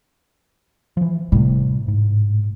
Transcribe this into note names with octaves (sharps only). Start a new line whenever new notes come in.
E3 F3
A2 C3 G3
G#2